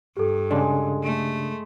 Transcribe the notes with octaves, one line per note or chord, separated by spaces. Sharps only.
G2 G4 A4
C#3 G#3 D4
A3